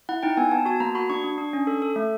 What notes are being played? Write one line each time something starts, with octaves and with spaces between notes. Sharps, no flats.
E4 F#5
D#4 G5
B3 G#5
B3 A5
F#4 A5
A#3 A#5
F#4 B5
D4 C#6
D4
D4
C#4
A4
A4
A3